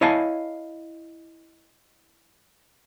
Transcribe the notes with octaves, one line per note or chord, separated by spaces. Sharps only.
E4 C#5 D#5 F5 G#5 A5